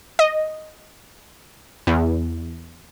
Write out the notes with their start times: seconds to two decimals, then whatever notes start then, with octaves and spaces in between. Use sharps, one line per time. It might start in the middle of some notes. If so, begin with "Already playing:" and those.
0.19 D#5
1.87 E2